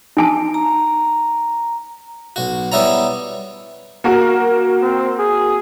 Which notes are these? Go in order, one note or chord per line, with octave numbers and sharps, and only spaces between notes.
D#4 G#5 A5
A#5
B1 F#4
G3 B3 E4 C#5 A#5
A#3 F#4 A#4
C4
G#4